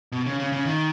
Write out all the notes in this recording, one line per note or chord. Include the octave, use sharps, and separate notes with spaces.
B2
C#3
C#3
C#3
D#3